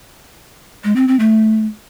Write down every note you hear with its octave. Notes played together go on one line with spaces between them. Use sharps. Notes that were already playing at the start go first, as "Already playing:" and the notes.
G#3
C4
C4
A3